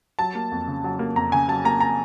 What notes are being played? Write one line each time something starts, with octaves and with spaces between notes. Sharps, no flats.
F#3 A5
A#3
F2
C#3
F#3
A#3
F2 A#5
C#3 G#5
F#3 A5
A#3 A#5
A#5